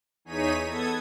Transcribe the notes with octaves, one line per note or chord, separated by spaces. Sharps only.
E2 D#4 G#4 C#5 B6 D#7
B3 A4 D#6 G#6